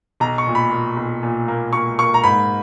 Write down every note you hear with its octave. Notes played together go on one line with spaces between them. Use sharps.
B1 A#5
C#6
A#2
B5
A#2
B1
A#2
A#3
A#3 C#6
A#3 C#6
A#5
G#2 B5